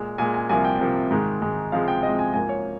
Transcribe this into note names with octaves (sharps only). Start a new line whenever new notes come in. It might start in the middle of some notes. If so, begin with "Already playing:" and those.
Already playing: A#2 G#3
A#2 G#3 G#5
G#5
C2 C3 F3 A#3 G#5
G5
C2 C3 F3 A#3
G#2 D#3 G#3
G#2 D#3 G#3
C#2 C3 F3 G#3 F5
G5
C#2 C3 F3 G#3 D#5
G#5
G#2 F3 A#3 G#5
C#5